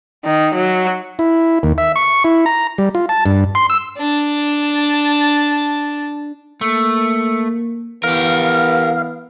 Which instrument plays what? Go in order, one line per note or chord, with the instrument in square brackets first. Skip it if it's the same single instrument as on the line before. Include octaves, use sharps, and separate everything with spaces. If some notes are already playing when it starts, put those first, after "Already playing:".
[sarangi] D#3
F#3
[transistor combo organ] E4
D#2
E5
C#6
E4
A#5
G3
F4
A5
G2
C6
E6
[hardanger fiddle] D4 A5
[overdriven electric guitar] A3 [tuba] A#3
[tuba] E3 [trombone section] B3 [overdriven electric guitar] G4 A#4 [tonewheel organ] F5